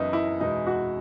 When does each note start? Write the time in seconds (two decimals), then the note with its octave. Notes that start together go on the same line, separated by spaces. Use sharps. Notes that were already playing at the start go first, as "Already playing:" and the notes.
Already playing: F#1 F#2 E3 B3 D#4 E4
0.13 E4
0.40 E2 B2 G#3 D#4
0.67 F#4